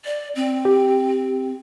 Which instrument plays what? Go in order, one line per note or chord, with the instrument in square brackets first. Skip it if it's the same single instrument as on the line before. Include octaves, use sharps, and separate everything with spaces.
[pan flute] D5
C4
[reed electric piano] G4